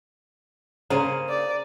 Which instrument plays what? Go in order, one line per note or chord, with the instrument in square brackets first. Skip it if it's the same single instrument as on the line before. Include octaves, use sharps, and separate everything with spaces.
[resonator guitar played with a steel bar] C#3 A#3 [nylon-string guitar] G#4 C5 [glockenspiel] A#5 D#7
[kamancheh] D5